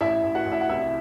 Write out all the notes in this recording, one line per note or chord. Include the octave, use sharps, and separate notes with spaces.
A1 E4 E5
A1
F#4 F#5
A1
E4 E5
F#5
C2 E4 E5